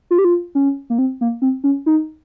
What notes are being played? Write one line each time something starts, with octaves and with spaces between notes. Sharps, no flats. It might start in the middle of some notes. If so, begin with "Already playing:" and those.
F4
G4
F4
C#4
A#3
C4
A#3
C4
C#4
D#4